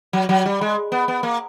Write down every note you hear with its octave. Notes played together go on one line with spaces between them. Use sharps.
F#3
F#3
G3
G#3
B3
B3
A#3